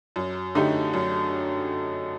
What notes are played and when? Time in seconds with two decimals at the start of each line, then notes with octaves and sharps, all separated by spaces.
0.16 F#2
0.55 D3 A3 D#4 G4
0.93 F#2